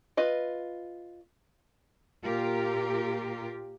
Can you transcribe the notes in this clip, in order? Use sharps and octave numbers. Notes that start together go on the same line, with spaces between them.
F4 B4 D#5
A#2 F4 G4 A#4